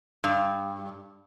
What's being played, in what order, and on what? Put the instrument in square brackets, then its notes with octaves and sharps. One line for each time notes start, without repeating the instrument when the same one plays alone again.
[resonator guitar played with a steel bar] G2